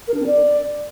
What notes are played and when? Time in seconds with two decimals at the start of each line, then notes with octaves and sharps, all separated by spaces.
0.08 A#4
0.14 D4
0.20 C4
0.26 D5